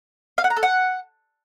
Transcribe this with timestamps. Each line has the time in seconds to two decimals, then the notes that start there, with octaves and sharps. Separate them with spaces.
0.38 F5
0.44 F#5
0.50 A#5
0.57 A4
0.63 F#5